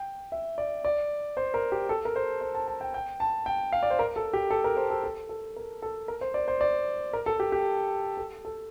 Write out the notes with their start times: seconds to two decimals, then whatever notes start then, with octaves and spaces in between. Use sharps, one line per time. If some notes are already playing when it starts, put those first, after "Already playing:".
Already playing: G5
0.32 E5
0.58 D5
0.85 D5
1.37 C5
1.54 A#4
1.72 G4
1.89 A4
2.05 A#4
2.16 C5
2.41 C5
2.55 A5
2.68 A5
2.81 G5
2.94 G5
3.20 A5
3.46 G5
3.72 F5
3.83 D5
3.90 C5
3.99 A#4
4.16 A4
4.33 G4
4.51 A4
4.64 A#4
4.77 C5
4.90 A4
5.04 A4
5.29 A4
5.56 A#4
5.82 A4
6.08 A#4
6.21 C5
6.34 D5
6.48 C5
6.61 D5
7.13 A#4
7.26 A4
7.40 G4
7.52 G4
8.17 A4
8.45 A4